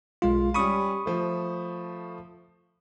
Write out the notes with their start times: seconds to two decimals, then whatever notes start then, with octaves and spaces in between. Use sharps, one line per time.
0.22 B1 G#3 F4 F5
0.54 G3 C#4 B5 C#6 D#6 D#7
1.06 F3 A3